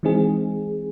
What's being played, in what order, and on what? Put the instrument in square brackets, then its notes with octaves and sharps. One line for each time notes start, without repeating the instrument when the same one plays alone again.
[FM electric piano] E3 G#3 C4 D#4 G#4